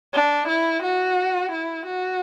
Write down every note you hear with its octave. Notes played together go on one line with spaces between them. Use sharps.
D4
E4
F#4
E4
F#4